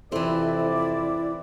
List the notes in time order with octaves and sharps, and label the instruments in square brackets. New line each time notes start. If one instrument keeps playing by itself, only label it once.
[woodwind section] F2 C3 [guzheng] E3 C4 [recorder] E4 [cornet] D5